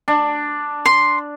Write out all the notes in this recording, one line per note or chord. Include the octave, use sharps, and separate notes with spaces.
D4
C6